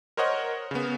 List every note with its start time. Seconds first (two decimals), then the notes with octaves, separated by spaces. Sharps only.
0.17 A#4 C5 C#5 D#5 F#5
0.71 C#3 B3